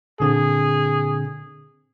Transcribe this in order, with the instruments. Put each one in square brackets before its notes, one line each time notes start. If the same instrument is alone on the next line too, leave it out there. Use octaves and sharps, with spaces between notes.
[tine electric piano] A#2 D3 C4 [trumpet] G#4